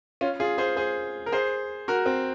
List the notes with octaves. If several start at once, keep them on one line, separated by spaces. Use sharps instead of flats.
C#4 F4
F4 G#4
G#4 C5
G#4 C5
A#4
G#4 C5
F#4 A#4
C4